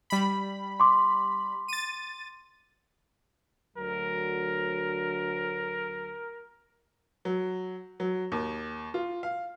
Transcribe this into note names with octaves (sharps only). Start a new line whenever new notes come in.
G3 B5
C6 D6
A6 D#7
D2 F#3 A#4
F#3
F#3
D#2
F4
F5